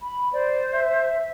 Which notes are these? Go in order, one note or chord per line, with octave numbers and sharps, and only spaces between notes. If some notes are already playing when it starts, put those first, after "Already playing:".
B5
C5 D5
E5